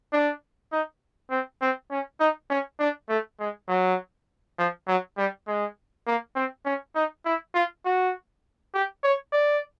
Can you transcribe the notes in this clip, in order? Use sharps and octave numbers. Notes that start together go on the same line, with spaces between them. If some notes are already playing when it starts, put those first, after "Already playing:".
D4
D#4
C4
C4
C#4
D#4
C#4
D4
A3
G#3
F#3
F3
F#3
G3
G#3
A#3
C4
C#4
D#4
E4
F4
F#4
G4
C#5
D5